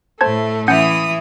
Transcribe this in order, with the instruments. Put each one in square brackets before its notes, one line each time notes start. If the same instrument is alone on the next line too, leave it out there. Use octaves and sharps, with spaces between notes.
[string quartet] A2 A3 [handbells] C5 A5 G#6
[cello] E3 E4 [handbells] C#4 F#5 G6 [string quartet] D#6